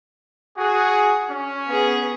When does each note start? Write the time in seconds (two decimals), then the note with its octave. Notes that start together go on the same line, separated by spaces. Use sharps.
0.58 F#4 G#4
1.30 C#4
1.67 B3 G#4